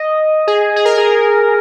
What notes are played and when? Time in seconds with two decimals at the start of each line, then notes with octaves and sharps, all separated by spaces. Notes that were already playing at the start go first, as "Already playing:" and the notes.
Already playing: D#5
0.47 G#4
0.76 G#4
0.85 A#4
0.98 G#4